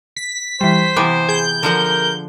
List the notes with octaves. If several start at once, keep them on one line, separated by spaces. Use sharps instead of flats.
B6
E3 G3 C5
C3 E3 B3 D6
G#4 G6
D3 F3 A#4 F#5